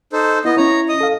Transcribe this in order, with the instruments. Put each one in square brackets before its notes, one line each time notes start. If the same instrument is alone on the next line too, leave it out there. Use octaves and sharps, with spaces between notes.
[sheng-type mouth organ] D#4 A4 C5
[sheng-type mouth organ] B3 D#5 [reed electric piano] E4
[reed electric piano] C#4 E4 [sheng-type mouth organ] C#5 A#5
[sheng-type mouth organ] D#5 D#6
[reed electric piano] A4 F5